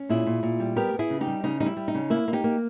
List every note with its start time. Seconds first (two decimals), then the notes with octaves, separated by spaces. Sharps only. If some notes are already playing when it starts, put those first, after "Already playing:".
Already playing: C#4
0.09 A#2 E4 G#4
0.26 A#2
0.43 A#2
0.60 G3
0.76 B3 G4 A#4
0.94 B3
0.99 E4 G#4
1.10 C#3
1.21 D#4 G4
1.27 G3
1.44 C#3 D#4
1.60 G3 D#4
1.66 E4
1.77 G3
1.88 D#4
1.95 C#3
2.10 A#3 E4
2.28 A#3
2.33 D#4 G4
2.44 A#3